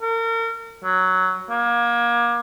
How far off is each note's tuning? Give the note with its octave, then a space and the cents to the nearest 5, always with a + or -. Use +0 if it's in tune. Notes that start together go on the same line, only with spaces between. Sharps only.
A#4 -35
F#3 +5
A#3 +30